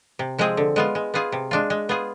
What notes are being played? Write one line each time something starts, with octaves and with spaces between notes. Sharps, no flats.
C3
F3 G#3 C4 G#4
D3
G#3 B3 F4
G#3
B3 F4 G#4
C3
G#3 D4 F4
G#3
B3 F4 G#4